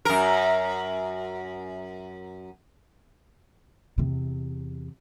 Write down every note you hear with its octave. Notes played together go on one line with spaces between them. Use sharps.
F#2 A#4
E2 C3